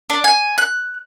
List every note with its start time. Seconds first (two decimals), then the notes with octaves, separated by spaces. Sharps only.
0.10 D4
0.24 G#5
0.58 F#6